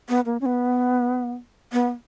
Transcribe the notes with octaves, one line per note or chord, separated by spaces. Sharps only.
B3
A#3
C#4
B3
B3